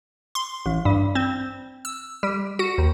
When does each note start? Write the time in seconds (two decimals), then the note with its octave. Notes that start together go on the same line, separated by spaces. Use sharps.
0.35 C6
0.66 A1
0.85 G2
1.15 C4
1.85 E6
2.23 G3
2.59 F#4
2.78 D#2